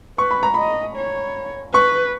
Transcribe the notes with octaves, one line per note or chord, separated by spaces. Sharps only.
B4 C#6
B5
A#5
D#5 B5
C#5
B4 C#6